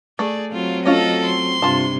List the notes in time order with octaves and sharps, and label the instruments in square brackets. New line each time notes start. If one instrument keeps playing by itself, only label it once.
[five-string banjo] A3 [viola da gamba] G#4 [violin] D5
[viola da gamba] F#3 C4 [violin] F4
[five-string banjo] A3 C#4 F4 [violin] A4 D#5
[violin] C6
[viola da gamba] G2 C3 [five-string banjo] F4 A5